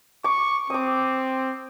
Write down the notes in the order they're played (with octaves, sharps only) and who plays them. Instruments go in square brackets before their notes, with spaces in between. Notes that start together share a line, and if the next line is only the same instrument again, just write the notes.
[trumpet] C#6 [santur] D6
[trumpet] C4 [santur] D6 D#6